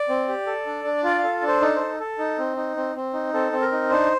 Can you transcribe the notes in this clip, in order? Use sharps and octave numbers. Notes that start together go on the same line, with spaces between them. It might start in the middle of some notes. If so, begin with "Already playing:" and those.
Already playing: D5
C4
G4
A4
D4
D4
F4 D5
F5
A4
D4
C5
D#4 A4
A4 C5
A4
D#4
C4
D#4
C4
C4
D#4
C4 A4
C4
A#4
D#4
D4 C5